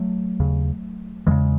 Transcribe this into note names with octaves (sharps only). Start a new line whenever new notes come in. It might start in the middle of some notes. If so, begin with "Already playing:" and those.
Already playing: F#3 A3
D#2 C#3
E2 C#3 E3 G#3